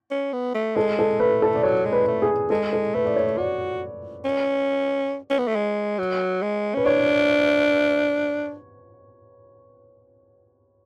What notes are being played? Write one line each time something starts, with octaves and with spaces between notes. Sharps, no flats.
C#4
B3
A3
G#3 A4
A4
A3 B4
A4
D5
F#3 C#5
G#3
B4
A3
G#4
G#3 A4
A4
A3 B4
D5
C#5
F#4 D5
C#4
C#4
B3
A3
G#3
F#3
G#3
C#4 B4
D4 C#5